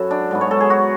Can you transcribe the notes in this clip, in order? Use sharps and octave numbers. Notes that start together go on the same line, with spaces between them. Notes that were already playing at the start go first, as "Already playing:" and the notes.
Already playing: F#2 E4 F#4 A4
D4
G#2 F#3 B3
C#5
A4
G#4
F#4